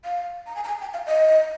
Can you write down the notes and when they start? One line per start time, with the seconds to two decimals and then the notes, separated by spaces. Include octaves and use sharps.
0.05 F5
0.47 A#5
0.56 G#5
0.64 A#5
0.68 G#5
0.81 G5
0.94 F5
1.06 D#5